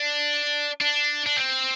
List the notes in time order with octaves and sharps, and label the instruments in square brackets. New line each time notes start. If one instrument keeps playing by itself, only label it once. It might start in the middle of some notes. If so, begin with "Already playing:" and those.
Already playing: [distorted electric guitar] D4
D4
D4
C4